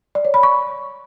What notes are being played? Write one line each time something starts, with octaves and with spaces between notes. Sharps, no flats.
D5
C#5
B5
C#6